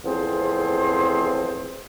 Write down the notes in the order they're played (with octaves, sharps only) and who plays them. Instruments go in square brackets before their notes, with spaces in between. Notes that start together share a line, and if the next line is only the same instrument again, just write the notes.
[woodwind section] E2 A2 F3 C4 G#4 C5